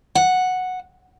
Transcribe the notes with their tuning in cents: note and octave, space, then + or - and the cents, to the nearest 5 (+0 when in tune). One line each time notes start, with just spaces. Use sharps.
F#5 -5